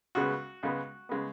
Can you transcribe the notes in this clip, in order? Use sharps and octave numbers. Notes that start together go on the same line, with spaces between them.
C#2 C#3 G#3 B3 F#4
C#2 C#3 G#3 B3
C#3 G#3 B3